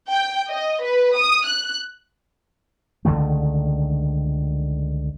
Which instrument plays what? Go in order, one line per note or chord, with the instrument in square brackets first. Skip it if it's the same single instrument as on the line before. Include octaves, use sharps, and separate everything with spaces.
[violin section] G5
D#5
B4
D#6
F#6
[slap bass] C#2 D3 D#3 A3